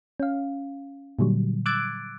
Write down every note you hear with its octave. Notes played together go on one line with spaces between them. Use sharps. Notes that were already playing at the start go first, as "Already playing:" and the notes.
C#4 F5
A#2 D3 F#3 G3
D6 E6 F#6 G#6 A6 D7